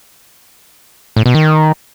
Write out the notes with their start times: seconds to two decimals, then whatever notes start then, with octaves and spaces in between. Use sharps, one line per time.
1.16 A2
1.26 B2
1.35 D#3